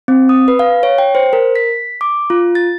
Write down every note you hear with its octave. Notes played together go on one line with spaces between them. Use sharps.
C4
D#6
B4
F5
C#5
G5
C5
A#4
B6
D6
F4
A6